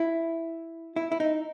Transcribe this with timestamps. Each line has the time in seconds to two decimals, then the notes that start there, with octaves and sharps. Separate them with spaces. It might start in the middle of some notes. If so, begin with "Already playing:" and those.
Already playing: E4
0.96 E4
1.12 E4
1.20 D#4